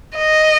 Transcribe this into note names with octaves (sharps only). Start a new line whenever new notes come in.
D#5